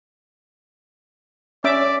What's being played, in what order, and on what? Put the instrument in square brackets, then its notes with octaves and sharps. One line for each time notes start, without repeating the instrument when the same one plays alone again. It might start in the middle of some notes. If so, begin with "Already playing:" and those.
[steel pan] C#4 E5 D6 [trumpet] D5